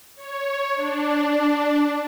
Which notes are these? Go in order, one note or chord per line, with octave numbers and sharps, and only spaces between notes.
C#5
D4